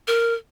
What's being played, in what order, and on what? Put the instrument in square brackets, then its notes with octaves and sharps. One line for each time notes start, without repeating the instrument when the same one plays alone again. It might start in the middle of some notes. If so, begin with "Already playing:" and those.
[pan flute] A#4